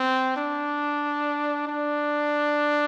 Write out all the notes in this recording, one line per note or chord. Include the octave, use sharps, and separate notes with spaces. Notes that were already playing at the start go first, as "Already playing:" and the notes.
Already playing: C4
D4
D4